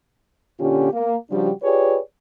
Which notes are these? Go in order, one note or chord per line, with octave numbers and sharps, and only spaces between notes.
A#2 D3 C#4 F4 G4
A#3
C#3 F3 G3 D4 F#4 G4
F4 G4 G#4 B4 C#5 D5